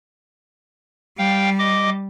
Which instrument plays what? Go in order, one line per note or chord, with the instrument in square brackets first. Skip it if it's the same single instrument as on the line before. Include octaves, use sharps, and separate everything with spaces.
[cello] G3 [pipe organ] F5 G5
[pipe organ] D#5 D6